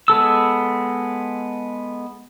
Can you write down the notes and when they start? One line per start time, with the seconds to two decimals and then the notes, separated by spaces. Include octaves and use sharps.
0.08 G#3 B3 A4 E6